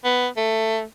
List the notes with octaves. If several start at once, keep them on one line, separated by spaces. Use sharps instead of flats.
B3
A3